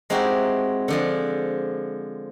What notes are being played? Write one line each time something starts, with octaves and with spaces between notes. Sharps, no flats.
G#3 C4 D#4 E4 F#4 G4
D3 F3 G#3